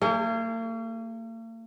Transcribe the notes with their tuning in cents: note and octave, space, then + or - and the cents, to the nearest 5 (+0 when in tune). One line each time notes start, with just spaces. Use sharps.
A#3 -45 E4 +10 G#4 +0